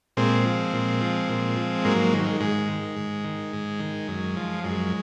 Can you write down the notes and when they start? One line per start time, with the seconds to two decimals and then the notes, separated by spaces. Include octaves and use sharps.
0.17 A#2 G#3 C4
0.45 F3
0.73 A#2
1.01 F3
1.29 A#2
1.56 F3
1.85 G#2 F#3 A#3
2.13 D#3 G#3
2.19 F#3
2.26 G#3
2.40 G#2 G#3
2.68 D#3
2.96 G#2
3.24 D#3
3.53 G#2
3.80 D#3
4.08 F#2
4.37 F3
4.64 F#2 G#3